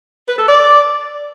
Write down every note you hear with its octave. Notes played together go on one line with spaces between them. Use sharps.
B4
A4
D5